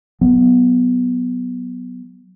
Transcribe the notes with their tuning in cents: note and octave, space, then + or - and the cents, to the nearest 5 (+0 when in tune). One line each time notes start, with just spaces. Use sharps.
F#3 +0 B3 +0